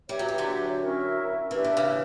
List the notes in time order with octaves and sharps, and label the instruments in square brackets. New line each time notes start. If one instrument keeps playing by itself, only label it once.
[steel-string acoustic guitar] G3 [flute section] G4 C#5 E5
[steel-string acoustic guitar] F#3
E3
D3 F#3
[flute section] C#4 E4 A#4 E5
[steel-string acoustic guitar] E3 [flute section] D4 G4 B4 E5
[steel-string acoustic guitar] D3
C#3 E3